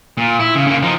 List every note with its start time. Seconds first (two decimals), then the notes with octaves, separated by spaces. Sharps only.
0.17 A#2
0.40 E4
0.55 C#3
0.67 C#3 A#3
0.82 F3 D#4